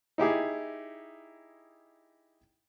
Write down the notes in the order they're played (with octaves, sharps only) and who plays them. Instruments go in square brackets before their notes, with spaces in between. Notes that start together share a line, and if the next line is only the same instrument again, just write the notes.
[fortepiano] D#4 E4 G4 G#4